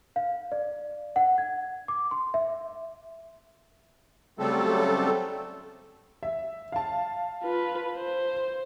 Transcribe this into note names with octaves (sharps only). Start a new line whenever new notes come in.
F5
D5
F#5
G#6
D6
C6
E5
C#3 F#3 G3 A3 C4 A4
E5
F5 A5
F4 B4
C5